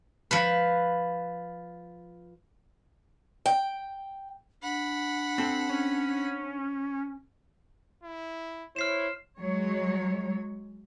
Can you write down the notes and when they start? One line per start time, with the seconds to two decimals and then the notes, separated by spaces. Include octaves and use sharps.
0.31 F3 B4
3.46 G5
4.62 D4 F#5 B5
5.38 C4 A4
5.69 C#4
8.03 E4
8.76 E4 C5 C#5 F6 C7 E7
9.38 F#3 G#3 C#5